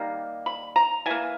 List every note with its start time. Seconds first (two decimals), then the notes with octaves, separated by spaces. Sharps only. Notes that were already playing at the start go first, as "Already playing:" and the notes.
Already playing: D#3 G3 A#3
0.46 B5
0.76 A#5
1.06 E3 A#3 G#5